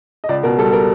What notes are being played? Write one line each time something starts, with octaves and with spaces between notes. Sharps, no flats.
D#5
C#2 D5
B2 A#4
G3 A4
A#4